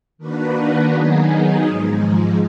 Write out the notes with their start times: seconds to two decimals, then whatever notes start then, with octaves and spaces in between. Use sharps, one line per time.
0.18 D#3 A#3 D4 F#4 B4
0.91 D#3 F#3 B3 D#4 G#4
1.65 G#2 F3 G#3